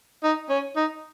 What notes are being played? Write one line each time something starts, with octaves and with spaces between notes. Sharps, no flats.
D#4
C#4
D#4